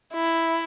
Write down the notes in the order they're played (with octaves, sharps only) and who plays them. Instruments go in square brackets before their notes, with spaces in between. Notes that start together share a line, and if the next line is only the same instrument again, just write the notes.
[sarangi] E4